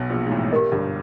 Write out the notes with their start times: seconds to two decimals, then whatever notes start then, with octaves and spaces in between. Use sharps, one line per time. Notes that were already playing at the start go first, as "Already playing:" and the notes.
Already playing: B1 B2
0.10 A#1 A#2
0.26 G#2
0.31 A1 A2
0.52 G4 A#4 D#5
0.72 G1 G2